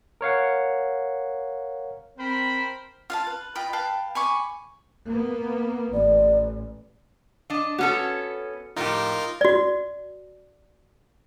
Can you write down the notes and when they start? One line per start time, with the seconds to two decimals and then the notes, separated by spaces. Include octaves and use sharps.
0.21 A#4 C#5 F5 F#5
2.18 C4 A#4 C5 B5
3.10 F4 F5 A5
3.27 B4
3.55 F4 D#5 G5 B5
3.73 B4 F5 G5 A5
4.15 G#5 B5 C#6 D6
5.08 A#3 B3
5.93 A1 D5
7.50 D4 D#5
7.78 B3 C#4 F#4 A4
8.76 F2 A2 D#4 F4 G4 A#4
9.41 F#4 D5